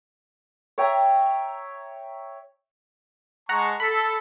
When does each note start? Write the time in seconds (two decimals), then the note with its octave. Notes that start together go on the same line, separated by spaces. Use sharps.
0.78 C#5 E5 G5 A#5
3.49 G#3 F#5 A5 A#5 C#6
3.80 A4 B5